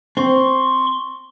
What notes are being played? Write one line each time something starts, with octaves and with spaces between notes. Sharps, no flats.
C4 C6 C#6